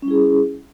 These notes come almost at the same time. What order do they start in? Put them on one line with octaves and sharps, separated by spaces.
C#4 G3 E4 G#4